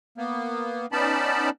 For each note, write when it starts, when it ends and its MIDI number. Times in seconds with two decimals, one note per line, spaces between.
0.18 0.86 58
0.18 0.86 59
0.92 1.50 59
0.92 1.50 61
0.92 1.50 63
0.92 1.50 74
0.92 1.50 81
0.92 1.50 83